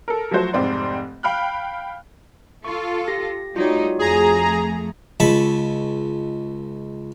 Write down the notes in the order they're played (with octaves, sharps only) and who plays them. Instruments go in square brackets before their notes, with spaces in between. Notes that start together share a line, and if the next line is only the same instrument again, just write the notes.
[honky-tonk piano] A4 A#4
F3 F#3 A3 F#4 C5
F1 G#2 C4 D5 C6
F5 G5 B5 F6 F#6
[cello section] F4 A4 [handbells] C#6
[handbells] G4 A#6
[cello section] G3 A3 D#4 [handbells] F4 F#4 C#5
[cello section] F2 A3 [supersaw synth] G#4 A#5
[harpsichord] C#2 A5 B5 C#6